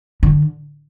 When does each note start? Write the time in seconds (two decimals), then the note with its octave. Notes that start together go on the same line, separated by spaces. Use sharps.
0.23 D3